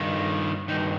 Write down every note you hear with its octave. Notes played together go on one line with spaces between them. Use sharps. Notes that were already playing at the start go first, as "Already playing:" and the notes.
Already playing: G2 D#3
G2 D#3 D#4